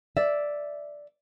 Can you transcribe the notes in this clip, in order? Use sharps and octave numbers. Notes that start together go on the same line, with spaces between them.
D5 E5